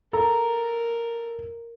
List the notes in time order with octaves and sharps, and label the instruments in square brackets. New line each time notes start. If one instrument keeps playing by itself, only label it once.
[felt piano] A4 [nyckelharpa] A#4 [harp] A#5